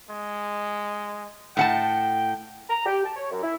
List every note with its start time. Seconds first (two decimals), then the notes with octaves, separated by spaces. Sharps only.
0.10 G#3
1.57 A2 F#5 G5 A5
2.69 A#5
2.86 G4
3.04 A5
3.16 C#5
3.31 F#2
3.43 E4